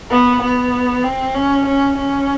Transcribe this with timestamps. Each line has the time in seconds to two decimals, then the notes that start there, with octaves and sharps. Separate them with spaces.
0.11 B3
0.42 B3
1.04 C4
1.34 C#4
1.65 C#4
1.96 C#4